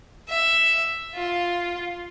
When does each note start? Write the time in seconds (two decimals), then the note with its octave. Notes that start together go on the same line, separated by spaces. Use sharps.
0.28 E5
1.14 F4